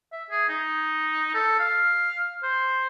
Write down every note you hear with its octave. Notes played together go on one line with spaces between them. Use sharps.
E5
G#4
D#4
A4
F5
C5